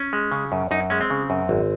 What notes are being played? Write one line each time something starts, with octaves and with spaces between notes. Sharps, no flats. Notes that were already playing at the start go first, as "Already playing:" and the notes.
Already playing: C#4
G#3
C#3
F#2
F#2 D#4
G#3 C#4
C4
C#3
F#2
G#1